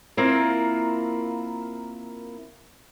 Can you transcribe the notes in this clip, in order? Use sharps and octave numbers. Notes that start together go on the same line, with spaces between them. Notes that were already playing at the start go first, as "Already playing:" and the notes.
A#3 C4 E4 F4 A#4